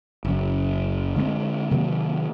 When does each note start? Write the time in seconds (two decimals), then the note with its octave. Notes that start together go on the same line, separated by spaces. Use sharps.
0.25 F#1 F#2
1.16 D3 G#3 A#3 C4
1.71 C3 D#3 F#3 A#3